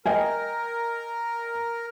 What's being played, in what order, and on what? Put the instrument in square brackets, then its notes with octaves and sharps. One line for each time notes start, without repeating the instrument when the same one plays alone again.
[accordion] A#4 [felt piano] D#5 G5 G#5